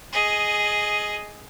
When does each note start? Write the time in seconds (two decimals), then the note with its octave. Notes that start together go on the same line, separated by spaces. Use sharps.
0.13 G#4 D#5